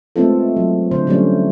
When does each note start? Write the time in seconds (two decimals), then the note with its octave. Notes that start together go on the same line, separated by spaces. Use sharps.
0.16 G#3 A3 B3 C4 F4 A4
0.57 F#3
0.91 D3 A3 C5
1.07 D3 F#3 G3 A3 C#4 C#5